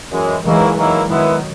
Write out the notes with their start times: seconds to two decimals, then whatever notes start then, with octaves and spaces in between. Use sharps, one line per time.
0.10 F#2 E3 G#3
0.43 D#3 E3 F#3 G#3 A#3 E4
0.76 D#3 F#3 A#3 E4
1.08 D#3 E3 F#3 G#3 B3 E4